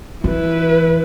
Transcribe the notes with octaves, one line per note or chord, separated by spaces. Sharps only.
E3 E4 B4